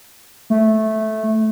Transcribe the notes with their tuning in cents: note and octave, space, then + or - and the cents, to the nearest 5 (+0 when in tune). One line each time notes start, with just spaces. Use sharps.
A3 -10